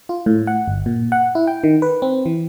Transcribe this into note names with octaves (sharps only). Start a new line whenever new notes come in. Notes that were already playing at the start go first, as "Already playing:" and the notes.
F4
A2
F#5
G1
A#2
F#5
E4
G5
D#3
B4
C4
E3